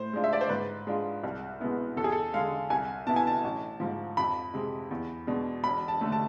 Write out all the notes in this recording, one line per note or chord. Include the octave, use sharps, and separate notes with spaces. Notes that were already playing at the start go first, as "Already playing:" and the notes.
Already playing: A2 C5
G#3 D4 F4
E5
D5
C5
G#2 B4
G#3 D4 F4
C2
B2 G#3 B3 E4
E2 A4
G#4
A4
D3 G#3 F5
C2 G#5
B2 B3 E4 A5
G#5
A5
A1
G#2 F3
F2 B5
C3 G#3
E2
B2 G#3 D4
E1 B5
A5
D3 A3
A5